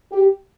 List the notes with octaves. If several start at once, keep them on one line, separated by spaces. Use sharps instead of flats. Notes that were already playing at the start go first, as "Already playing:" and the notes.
G4